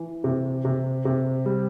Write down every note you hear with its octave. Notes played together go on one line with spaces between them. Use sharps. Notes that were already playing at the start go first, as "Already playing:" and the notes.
Already playing: E3
C3
C3
C3
G3